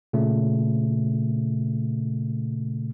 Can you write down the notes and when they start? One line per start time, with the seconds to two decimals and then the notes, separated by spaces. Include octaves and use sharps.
0.13 A#2 C#3 A3